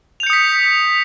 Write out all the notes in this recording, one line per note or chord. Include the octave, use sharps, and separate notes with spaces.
D#6 G6 B6 C#7 F7